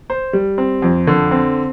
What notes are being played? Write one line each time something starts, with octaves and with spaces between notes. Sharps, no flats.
C5
G3
C4
F2
D3
C4